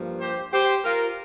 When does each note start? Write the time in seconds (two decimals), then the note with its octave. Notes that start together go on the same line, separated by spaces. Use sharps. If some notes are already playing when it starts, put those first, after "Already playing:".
Already playing: G2 F3 A#3
0.21 G4 C5
0.52 G4 C5
0.85 F4 A#4